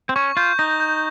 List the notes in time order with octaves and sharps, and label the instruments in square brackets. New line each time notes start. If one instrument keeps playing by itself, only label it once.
[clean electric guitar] C4
[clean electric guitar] C#4 [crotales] C#6
[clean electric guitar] F4 [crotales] G6
[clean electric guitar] D#4 [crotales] A#6
[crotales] G6